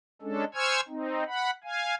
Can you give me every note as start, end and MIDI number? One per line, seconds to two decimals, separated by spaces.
0.22 0.45 56
0.22 0.45 61
0.22 0.45 62
0.22 0.45 69
0.55 0.81 72
0.55 0.81 80
0.55 0.81 85
0.55 0.81 88
0.55 0.81 89
0.55 0.81 92
0.88 1.24 60
0.88 1.24 63
1.27 1.50 78
1.27 1.50 83
1.64 1.95 77
1.64 1.95 80